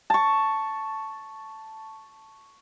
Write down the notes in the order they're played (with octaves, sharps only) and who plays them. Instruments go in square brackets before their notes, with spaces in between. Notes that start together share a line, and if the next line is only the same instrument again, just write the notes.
[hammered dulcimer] A5 C#6